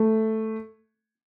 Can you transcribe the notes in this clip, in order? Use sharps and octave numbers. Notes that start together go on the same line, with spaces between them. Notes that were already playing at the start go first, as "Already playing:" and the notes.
Already playing: A3